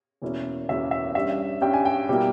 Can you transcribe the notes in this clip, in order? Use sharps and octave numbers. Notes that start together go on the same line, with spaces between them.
E2 B2 A#3 C#4 E4
E2 B2 A#3 C#4 E4 E5
E5
G2 G3 C#4 E5
G2 G3 C#4 G5
G#5
G5
B2 G3 A#3 E4